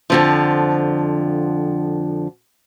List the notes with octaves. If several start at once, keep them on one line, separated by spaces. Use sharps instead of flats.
F2 D3 F3